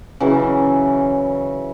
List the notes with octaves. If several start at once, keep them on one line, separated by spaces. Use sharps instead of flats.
C#3 E3 F#3